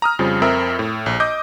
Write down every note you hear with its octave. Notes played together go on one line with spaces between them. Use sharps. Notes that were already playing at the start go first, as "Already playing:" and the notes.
A#5 D#6 F6
F2 C#3 F3 G3
F2 C4 A#4 E5 E6
A2
A#1
D#5 D6 D#6 G6